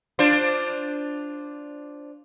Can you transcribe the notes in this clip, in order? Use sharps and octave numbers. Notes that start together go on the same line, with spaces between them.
D4 F4 C5